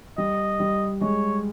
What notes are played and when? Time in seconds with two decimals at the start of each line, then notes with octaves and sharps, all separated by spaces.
0.18 G3 D#5
0.60 G3
1.01 G#3 C#5